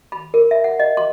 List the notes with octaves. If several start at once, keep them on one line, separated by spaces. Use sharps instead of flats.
B5
A#4
E5
F#5
D#5
C6